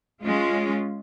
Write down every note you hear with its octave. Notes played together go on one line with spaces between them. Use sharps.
G#3 C#4 F4